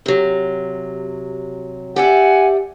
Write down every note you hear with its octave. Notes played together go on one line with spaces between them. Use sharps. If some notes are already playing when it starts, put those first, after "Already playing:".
C3 F#3
G4 D5 E5 F#5 G#5